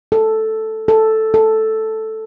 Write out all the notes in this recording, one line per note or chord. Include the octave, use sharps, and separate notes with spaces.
A4
A4
A4